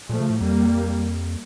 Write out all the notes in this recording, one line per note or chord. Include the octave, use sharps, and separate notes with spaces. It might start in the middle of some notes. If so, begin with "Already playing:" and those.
A#2 F3 A3
C#3
A2
F2 G3 A#3